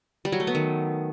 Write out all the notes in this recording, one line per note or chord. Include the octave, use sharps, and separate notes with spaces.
G3
F#3
A3
B3
D#3